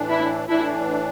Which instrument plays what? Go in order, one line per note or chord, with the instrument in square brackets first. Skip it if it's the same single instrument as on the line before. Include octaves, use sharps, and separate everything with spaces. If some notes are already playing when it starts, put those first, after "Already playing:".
Already playing: [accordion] A2 E3 D4
[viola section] E4
[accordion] A2 E3 D4 [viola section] E4